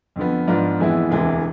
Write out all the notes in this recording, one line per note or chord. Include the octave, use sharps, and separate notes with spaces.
F2 D3 F3 B3
G#2 F3 B3 D4 F4
F2 E3 G#3 B3 E4
E1 D2 C3 E3 G#3